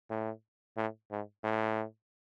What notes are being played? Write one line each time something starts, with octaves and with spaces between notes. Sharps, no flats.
A2
A2
G#2
A2